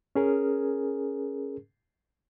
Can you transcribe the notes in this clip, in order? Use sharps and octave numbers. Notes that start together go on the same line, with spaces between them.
C#4 G#4 A#4